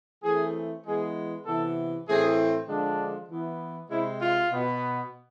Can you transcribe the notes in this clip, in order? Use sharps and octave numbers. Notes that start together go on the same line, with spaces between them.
E3 A3 C4 G#4
E3 G#3 B3 G#4
C3 E3 B3 A4
A2 E3 A3 C4 G#4
D3 F3 G#3 D4
E3 B3
C3 G#3 C4 E4
F4
B2 B3